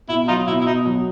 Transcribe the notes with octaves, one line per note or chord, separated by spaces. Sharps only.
B2 E4
F#3 D#4 F4
B2 E4
E4
B2 D#4
F#3